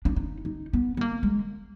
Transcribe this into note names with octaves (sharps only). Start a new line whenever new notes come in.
D4
D#4
D#4
B3
B3
A#3
G#3